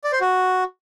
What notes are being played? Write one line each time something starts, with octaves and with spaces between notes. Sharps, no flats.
D5
C5
F#4